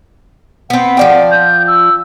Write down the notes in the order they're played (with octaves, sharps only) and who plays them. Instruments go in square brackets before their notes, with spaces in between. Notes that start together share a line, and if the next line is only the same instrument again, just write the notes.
[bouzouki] B3 C4 [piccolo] F#5
[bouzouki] F3 D5 G5
[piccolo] G6
E6